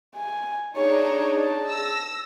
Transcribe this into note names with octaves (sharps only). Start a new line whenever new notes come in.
G#5
D4 D#4 G#4 C#5
A5
E6 A#6